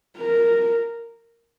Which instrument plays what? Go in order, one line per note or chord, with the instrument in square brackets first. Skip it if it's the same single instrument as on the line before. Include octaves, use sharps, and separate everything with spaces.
[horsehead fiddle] A#4